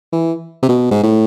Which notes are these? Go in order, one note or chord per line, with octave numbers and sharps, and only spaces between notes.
E3
C3
B2
G#2
A2